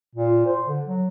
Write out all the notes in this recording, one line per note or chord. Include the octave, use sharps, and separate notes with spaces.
A#2
C5
D3
F#3